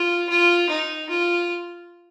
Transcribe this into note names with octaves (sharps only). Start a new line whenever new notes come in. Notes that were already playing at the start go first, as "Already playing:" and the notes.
Already playing: F4
F4
D#4
F4